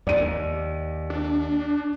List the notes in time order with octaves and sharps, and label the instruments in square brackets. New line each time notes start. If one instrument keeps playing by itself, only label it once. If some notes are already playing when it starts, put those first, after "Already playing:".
[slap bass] D#2 [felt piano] D5 D#7
[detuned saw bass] D4